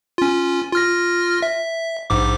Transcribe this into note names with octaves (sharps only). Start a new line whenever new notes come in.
C#4 F4
F4 F6 A#6
E5
A#1 G#2 D6